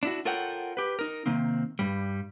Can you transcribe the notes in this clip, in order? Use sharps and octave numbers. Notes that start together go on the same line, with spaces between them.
D4 E4 F#4
F4 A4 A#4 C#5 F#5 G5
G4 B4
D#4 A#4
C3 D#3 A#3 C4
G2 G3